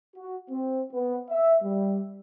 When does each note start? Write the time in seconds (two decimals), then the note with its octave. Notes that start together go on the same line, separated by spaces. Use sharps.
0.16 F#4
0.51 C4
0.93 B3
1.30 E5
1.63 G3